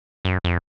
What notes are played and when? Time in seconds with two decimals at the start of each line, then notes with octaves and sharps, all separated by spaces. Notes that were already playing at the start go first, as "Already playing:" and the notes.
0.25 F#2
0.44 F2